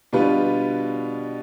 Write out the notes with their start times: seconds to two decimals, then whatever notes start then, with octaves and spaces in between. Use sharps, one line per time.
0.13 B2 G3 D4 F4 B4